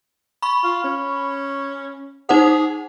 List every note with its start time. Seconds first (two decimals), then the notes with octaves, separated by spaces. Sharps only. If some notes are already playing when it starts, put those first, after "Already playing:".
0.42 B5 C#6
0.64 F4
0.84 C#4
2.29 D#4 G#4 C5 F#5